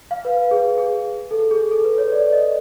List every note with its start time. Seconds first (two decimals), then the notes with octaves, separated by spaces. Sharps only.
0.11 F5
0.25 B4
0.51 G#4
0.78 G#4
1.31 A4
1.51 G#4
1.71 A4
1.84 B4
1.98 C#5
2.12 D5
2.32 D#5